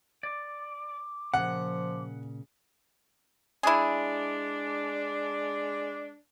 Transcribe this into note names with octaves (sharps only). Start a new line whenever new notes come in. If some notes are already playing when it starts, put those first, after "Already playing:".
D5 D6
A#2 C#3 F3 F#5
G#3 D4 E4 G#4